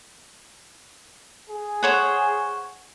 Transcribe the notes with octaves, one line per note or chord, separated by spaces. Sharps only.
G#4
C5 C#5 F#5